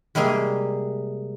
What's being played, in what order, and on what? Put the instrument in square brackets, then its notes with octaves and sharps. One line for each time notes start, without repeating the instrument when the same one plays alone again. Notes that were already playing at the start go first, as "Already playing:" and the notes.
[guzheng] C3 G3 G#3 A#3 G#4